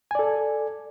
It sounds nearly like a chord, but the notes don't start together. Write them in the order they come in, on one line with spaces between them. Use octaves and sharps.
G#5 D5 A4